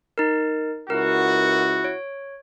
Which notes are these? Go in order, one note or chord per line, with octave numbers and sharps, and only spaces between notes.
D#4 A#4
C#2 E4 F#4 A#4
C#5